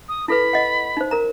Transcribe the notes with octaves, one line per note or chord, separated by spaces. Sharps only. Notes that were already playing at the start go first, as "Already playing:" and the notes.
D#6
E4 A4 B4 B5
D#5 F#5
D#4 C5
A#4 A#5